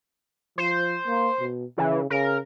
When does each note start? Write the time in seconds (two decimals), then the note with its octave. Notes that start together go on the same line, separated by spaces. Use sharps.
0.58 F3 C5
1.07 A#3
1.40 B2
1.78 C#3 E3
2.10 C#3 A#4